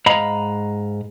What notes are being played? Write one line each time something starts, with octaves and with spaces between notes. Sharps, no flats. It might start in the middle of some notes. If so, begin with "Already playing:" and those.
G#2 D#5 F5 A#5 B5